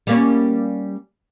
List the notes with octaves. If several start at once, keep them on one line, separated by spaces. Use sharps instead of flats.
G3 A#3 C#4